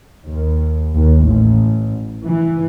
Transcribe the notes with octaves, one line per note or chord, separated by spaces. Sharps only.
D#2
D#2
A1
E3